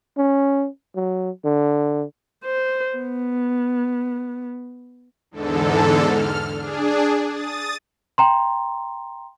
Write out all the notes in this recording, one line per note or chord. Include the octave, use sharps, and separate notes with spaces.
C#4
F#3
D3
C5
B3
E2 G#2 D3 A4
F6
D4 G#4
D#6 A6
G5 A#5 C6